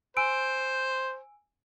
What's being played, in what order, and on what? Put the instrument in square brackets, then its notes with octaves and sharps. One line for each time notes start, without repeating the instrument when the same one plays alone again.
[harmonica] C5 [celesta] G#5 E6 D7